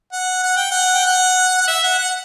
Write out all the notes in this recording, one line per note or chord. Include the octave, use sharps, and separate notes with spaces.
F#5
F#5
G5
F#5
G5
F#5
F#5
E5
F#5
F#5